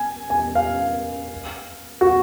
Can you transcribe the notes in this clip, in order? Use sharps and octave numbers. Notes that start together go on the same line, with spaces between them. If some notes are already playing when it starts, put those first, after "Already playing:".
Already playing: G#5
G#5
F5
F#4